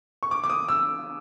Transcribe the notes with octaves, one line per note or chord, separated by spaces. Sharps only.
C#6
D6
D6
D#6
E6